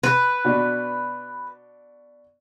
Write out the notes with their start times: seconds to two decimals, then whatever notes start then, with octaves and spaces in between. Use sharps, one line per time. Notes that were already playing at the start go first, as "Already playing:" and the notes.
0.03 B4
0.45 B2 D4 F#4